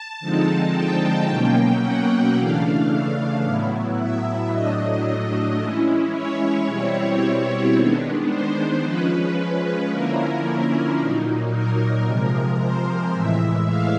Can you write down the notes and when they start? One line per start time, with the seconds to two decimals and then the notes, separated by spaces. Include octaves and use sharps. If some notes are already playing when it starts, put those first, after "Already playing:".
Already playing: A5
0.20 D3 F3 G#3 C4 D#4
0.74 G5
1.28 B2 F#3 A#3 C#4
1.81 F#5
2.36 C#3 E3 A3 D4 F5
3.44 A2 F#3 B3 E4
3.97 E5
4.50 A2 F#3 A3 D4 D#5
5.58 E3 G#3 C#4 E4
6.12 C#5
6.66 B2 G3 C4 E4
7.74 D#3 G#3 B3 D4
8.28 C5
8.82 F3 G#3 C#4 B4
9.36 B4
9.89 D3 F3 A#3 C#4 E4 A#4
10.98 A#2 F#3 A#3 D#4
11.52 A#4
12.05 C3 F3 G#3
12.59 C5
13.12 A2 E3 G#3 E5
13.67 F5